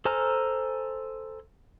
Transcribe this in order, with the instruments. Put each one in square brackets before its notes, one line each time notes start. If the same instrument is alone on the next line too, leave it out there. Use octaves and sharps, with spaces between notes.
[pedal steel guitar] A4 C5 G#5 A#5 F6